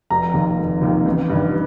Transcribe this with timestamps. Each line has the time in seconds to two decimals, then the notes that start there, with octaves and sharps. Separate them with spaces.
0.10 F1 A#5
0.34 D#2 D#3 A#3
0.58 F1
0.81 D#2 D#3 A#3
1.06 A1
1.30 G2 D#3